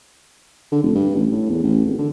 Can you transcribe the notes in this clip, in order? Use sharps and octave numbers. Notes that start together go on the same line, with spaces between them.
D3
F1
G2
A1
A2
E2
A1
G#1
D3